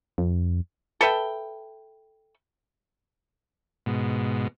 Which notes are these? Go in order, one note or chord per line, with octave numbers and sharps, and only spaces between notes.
F2
A4 B4 E5 G5
G#2 B2